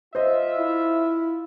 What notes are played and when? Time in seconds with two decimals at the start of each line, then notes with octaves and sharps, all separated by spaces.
0.15 F4 C5 D#5 E5
0.58 E4